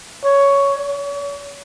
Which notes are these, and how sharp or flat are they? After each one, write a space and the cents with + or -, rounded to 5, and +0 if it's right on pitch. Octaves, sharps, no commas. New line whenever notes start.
C#5 +10
C#5 +40